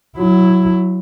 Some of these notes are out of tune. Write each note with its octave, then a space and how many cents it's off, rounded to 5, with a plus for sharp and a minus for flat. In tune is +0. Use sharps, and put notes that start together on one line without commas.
F#3 +0 E4 +10